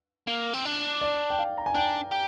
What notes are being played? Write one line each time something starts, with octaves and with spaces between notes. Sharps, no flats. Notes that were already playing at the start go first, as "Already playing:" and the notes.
A#3
C4
D4
D5
G5
F5
A#5
G#5
D4 G5
G4